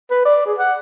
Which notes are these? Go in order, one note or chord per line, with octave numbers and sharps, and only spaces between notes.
B4
D5
G#4
F#5